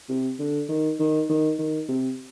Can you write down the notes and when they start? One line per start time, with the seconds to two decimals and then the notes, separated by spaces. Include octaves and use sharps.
0.09 C3
0.39 D3
0.69 D#3
0.99 D#3
1.30 D#3
1.59 D#3
1.89 C3